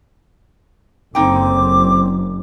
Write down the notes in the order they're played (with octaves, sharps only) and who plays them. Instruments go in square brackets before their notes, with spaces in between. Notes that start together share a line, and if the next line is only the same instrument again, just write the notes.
[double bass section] F#1 [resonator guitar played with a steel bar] D3 D#4 G5 [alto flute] C4 [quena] D6